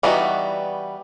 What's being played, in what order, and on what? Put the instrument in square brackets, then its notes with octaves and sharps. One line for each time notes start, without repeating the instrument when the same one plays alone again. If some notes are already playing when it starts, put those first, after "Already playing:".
[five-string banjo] E3 G3 B3 D#4 F#4